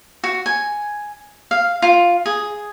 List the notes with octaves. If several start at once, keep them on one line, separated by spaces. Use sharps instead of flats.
F#4
G#5
F5
F4
G#4